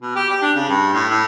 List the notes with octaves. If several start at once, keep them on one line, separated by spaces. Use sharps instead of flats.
B2
G4
G4
D4
C#3
G2
A2
A2